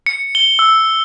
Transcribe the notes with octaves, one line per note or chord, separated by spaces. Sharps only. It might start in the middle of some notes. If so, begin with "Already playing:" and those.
C#7
G7
E6